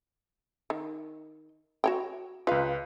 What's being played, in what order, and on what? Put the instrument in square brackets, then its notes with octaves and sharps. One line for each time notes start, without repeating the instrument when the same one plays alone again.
[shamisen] D#3
F#4 C#5 G5
[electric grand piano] C#2 B4 [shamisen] F4 F5